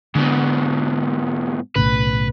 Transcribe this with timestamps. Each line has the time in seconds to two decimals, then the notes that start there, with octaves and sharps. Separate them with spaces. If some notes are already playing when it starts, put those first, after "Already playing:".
0.15 G#2 B2 D3
1.76 B1 A2 C#3 B4